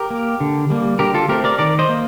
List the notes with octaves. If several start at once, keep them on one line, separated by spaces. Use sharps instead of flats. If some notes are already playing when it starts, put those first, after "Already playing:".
Already playing: G4 A#4
A#3
D3
G3 A#3
D3 G4 A#4
F4 A4
A3 C4 G4 A#4
A#4 D5
D#3 A#4 D5
C5 D#5
A#3